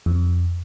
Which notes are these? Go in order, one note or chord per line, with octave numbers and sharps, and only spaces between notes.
F2